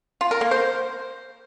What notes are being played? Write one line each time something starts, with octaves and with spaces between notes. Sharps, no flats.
F4
A#4
A#3
C5